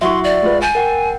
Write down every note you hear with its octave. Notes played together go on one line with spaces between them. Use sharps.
F#3 E4 E5 F#5 C6 C#6
D5
G#3 F4 B4
G#5 G6 A6
A#4 F#5 G5